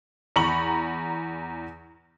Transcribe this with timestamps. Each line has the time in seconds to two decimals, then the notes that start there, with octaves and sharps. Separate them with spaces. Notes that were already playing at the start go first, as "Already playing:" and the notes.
0.36 E2 A#5 B5 C#6 F#7